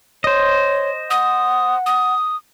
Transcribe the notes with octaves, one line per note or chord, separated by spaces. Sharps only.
C5 C#5 D#5
F#5 D#6
D#6